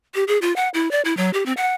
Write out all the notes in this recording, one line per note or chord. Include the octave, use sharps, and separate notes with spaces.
G4
G#4
F4
F#5
E4
D5
E4
F#3
G4
C4
F#5